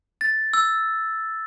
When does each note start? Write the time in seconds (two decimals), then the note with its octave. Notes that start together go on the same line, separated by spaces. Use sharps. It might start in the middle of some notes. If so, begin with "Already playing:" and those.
0.21 A6
0.53 E6